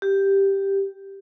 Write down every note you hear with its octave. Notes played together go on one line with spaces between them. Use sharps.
G4